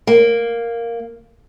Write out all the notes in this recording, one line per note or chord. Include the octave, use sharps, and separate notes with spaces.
A#3